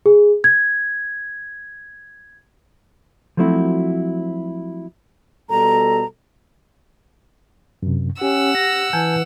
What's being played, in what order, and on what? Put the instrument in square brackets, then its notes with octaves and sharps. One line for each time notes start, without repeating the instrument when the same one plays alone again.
[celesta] G#4
G#6
[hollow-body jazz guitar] F3 F#3 A3 C4 E4 F#4
[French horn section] B2 G3 A4 [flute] A#5
[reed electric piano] F#2 C3
[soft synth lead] C#4 [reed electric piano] G4 [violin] F#5 E6
[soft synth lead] A#6
[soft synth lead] E3 [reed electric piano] G#5 A5 G6